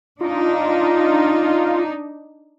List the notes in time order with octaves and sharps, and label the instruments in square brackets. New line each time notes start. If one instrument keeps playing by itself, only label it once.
[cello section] D4 D#4 [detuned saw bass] F4